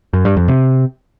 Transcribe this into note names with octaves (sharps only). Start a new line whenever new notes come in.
F#2
G2
F2
C3